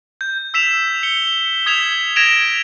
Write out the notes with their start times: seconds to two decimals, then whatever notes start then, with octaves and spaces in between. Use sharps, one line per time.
0.21 G6
0.54 E6 B6 E7 F7
1.03 C#7 G7
1.66 D#6 G#6 B6 E7 F7 G7
2.16 G#6 A#6 D7 E7 F7